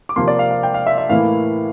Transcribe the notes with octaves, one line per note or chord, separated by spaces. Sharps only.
D6
C3 F3 A#3 C6
D5
F5
F5
G5
F5
E5
E5
A2 E3 A#3 E4 F5